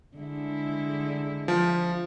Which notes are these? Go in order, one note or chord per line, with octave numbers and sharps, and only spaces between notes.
D3 G#3 E4
F3